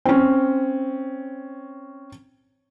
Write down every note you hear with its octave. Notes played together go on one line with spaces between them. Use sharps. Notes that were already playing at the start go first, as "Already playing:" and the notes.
C4 C#4